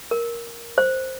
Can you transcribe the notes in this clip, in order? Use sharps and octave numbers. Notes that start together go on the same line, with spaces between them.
A#4
C5